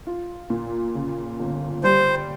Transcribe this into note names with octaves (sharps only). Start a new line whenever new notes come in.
F4
A#2
C#3
G1
G3 C5